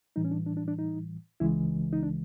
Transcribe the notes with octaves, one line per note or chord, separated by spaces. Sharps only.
A2 E3 G3 D#4
C#4
D4
D4
D4
D4
D#4
C#2 C#3 E3 G#3 E4
D#4
D4